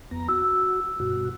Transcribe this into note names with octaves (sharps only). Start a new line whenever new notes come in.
F2 B3 A#5
F#4 E6
G2 B2 F#4